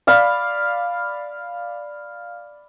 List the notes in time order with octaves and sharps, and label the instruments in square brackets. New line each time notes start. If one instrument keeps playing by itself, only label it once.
[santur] D5 F5 B5